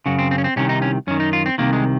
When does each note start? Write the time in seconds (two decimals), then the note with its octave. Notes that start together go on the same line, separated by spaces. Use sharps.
0.06 F#2 C#3 F#4
0.19 C4
0.31 C4
0.38 C#4
0.44 C4
0.56 C2 C3 D#3 C#4
0.69 D#4
0.82 C#4
1.07 F#2 D#3 C#4
1.20 D#4
1.33 F4
1.46 C4
1.58 C2 C3 D#3 A#3
1.73 G#3